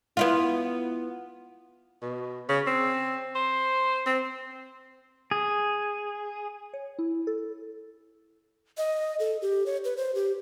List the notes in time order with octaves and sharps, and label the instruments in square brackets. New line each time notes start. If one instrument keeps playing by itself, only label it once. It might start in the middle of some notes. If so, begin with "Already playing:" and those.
[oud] B3 E4 F4
[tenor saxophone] B2
C#3
C4
C5
C4
[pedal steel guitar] G#4
[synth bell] C#5
E4
A4
[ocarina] D#5
A4
G4
C#5
B4
C5
G4